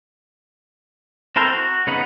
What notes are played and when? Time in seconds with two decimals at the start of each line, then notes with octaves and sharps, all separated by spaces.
1.36 C4 E4 A4 A#4 C5
1.48 F#4
1.87 C#3 B3 D#4 F#5